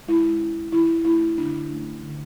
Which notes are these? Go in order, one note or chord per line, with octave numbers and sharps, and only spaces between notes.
G#3 E4
C#4
E3 E4
A3 D4 E4
D3 D4
A3 C#4
D3